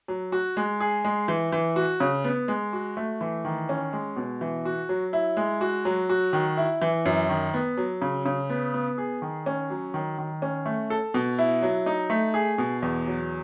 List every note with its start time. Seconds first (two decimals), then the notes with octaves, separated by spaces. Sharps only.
0.08 F#3
0.32 F#4
0.57 G#3
0.80 G#4
1.05 G#3
1.28 E3
1.52 E3
1.76 F#4
2.00 C#3
2.24 B3
2.48 G#3
2.73 F#4
2.97 A3
3.21 E3
3.45 D#3
3.69 C#4
3.93 G#3
4.16 B2
4.41 E3
4.65 F#4
4.89 F#3
5.13 E4
5.37 G#3
5.61 F#4
5.85 F#3
6.09 F#4
6.33 D#3
6.57 E4
6.82 E3
7.05 F#2
7.29 D#3
7.54 B3
7.77 F#3
8.02 C#3
8.26 C#3
8.50 B3
8.74 B3
8.98 G#4
9.22 D#3
9.46 C#4
9.70 F#3
9.94 D#3
10.18 D#3
10.42 C#4
10.66 A3
10.90 A4
11.14 B2
11.39 E4
11.62 F#3
11.86 D#4
12.10 A3
12.34 G#4
12.58 B2
12.82 E2
13.07 F#3